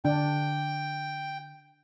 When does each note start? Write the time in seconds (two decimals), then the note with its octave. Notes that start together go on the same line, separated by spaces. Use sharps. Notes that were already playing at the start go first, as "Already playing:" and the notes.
0.05 D3 D4 G5